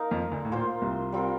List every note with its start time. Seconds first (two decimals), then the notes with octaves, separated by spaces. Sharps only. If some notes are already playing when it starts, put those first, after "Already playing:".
Already playing: A#3 D#4 A#4 F5
0.11 F2 F3
0.32 D2 D3
0.45 A2
0.52 A#2 A#3 F4 C5
0.81 C2 C3
1.12 G3 C4 F4 A#4